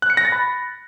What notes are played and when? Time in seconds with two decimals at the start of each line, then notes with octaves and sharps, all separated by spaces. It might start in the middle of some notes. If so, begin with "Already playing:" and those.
0.02 F#6
0.10 C#7
0.17 A#6
0.25 A6
0.32 B5